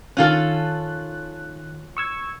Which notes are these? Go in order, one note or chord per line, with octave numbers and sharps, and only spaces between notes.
D#3 C#4 F4 A4 F#6
C#6 E6 G#6